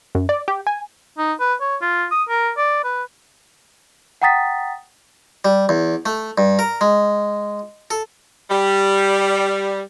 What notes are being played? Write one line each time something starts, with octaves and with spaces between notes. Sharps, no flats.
F#2
D5
G4
G#5
D#4
B4
C#5
F4
D#6
A#4
D5
B4
F#5 G5 A#5 D#6 A6 B6
G3
E2
A3
G2
A#4
G#3
A4
G3